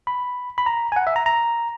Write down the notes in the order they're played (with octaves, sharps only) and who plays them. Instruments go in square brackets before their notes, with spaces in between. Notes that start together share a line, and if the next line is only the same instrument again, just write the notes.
[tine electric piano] B5
B5
A#5
G#5
F#5
E5
A#5
A#5